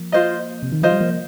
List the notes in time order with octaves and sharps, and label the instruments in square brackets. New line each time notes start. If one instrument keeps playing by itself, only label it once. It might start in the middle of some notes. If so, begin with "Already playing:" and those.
Already playing: [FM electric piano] F3 A#3
[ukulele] F4 C5 D#5
[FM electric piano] C3
D#3
[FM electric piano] F3 [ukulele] F4 C5 D#5
[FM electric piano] G3
F3 A#3